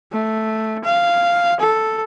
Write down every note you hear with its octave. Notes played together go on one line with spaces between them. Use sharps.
A3
F5
A4